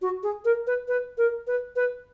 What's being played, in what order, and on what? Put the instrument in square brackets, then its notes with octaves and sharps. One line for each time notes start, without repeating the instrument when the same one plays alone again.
[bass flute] F#4
G#4
A#4
B4
B4
A#4
B4
B4